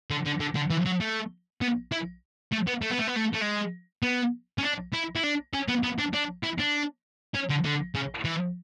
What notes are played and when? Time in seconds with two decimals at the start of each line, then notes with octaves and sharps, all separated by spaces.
0.10 D3
0.26 D3
0.40 D3
0.55 D3
0.70 E3
0.86 F#3
1.01 A3
1.62 B3
1.92 E4
2.52 A3
2.67 B3
2.82 A3
2.91 B3
2.99 A3
3.08 B3
3.17 A3
3.34 A3
3.42 G#3
4.03 B3
4.58 C#4
4.63 D4
4.93 E4
5.15 E4
5.23 D4
5.54 C#4
5.68 B3
5.84 B3
5.99 D4
6.14 D4
6.44 E4
6.59 D4
7.34 C#4
7.49 D3
7.64 D3
7.95 C#3
8.25 E3